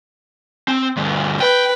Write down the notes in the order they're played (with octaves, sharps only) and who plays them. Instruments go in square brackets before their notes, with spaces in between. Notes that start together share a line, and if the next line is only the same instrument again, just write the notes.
[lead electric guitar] C4
D2 G2
[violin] B4 [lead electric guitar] G5